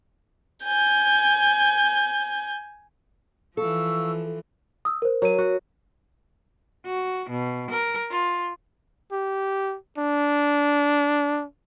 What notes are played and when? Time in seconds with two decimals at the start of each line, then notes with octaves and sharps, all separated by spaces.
0.64 G#5 G6
3.57 E3 F3 A4 F5 C#6 E6
4.85 D#6 E6
5.02 A#4 C5
5.22 F#3 A#4 D#7
5.38 F#4
6.86 F#4
7.30 B2
7.70 A#4
8.12 F4
9.12 G4
9.98 D4